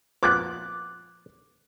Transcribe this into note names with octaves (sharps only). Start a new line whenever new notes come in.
A#2 F3 B3 D6 F#6